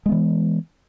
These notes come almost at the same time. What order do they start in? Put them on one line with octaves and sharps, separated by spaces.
G#3 B3 E3